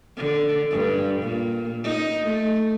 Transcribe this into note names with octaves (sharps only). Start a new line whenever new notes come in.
D3
G2
A#2
D#4
A3